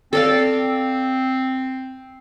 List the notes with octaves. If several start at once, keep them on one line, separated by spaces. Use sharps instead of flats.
C4 A4 D5 F5